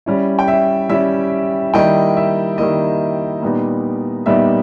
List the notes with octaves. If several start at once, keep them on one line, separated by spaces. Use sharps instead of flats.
G3 C#4 E4
G5
E5
G3 C#4 E4 E5
D#3 G3 A#3 E4 D#5 G5
E5
D#3 G3 A#3 E4 D#5
A#2 G3 B3 D#4
A#2 G3 B3 D#4 E5